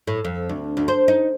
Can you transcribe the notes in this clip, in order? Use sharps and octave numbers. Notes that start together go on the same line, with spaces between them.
A2
F2
D2
D2
C5
D#4